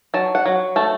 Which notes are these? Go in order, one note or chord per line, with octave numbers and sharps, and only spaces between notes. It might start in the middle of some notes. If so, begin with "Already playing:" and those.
F#3 A5
F#5
F#3
A3 A5